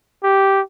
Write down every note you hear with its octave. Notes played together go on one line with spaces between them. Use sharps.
G4